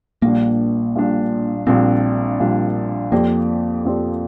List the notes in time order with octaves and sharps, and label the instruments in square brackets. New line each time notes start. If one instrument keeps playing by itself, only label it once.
[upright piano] A#1 A#2 G3 D4 [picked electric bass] A#3
[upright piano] A#1 A#2 G3 D4
[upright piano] A#1 A#2 G3 D4 [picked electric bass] C4
[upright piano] A#1 A#2 G3 D4
[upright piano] F2 F3 C4 G4 D5 [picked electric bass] A#3
[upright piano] F2 F3 C4 G4 D5